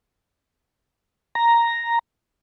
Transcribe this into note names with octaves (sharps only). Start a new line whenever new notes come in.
A#5